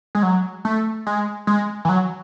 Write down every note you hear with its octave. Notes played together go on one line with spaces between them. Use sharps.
G#3
F#3
A3
G#3
G#3
E3
F#3